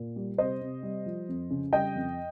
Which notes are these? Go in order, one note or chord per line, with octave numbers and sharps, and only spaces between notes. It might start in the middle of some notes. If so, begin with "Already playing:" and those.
Already playing: A#2
G3
C3 C5 D#5
C3
G3
F3
F2
C#3
G3 D#5 G5
F2